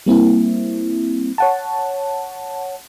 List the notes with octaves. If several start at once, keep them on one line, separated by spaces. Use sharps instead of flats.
G3 A#3 C4 E4
C#5 F#5 A5